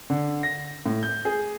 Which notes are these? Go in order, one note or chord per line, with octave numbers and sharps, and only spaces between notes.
D3
A#6
A2
G6
G#4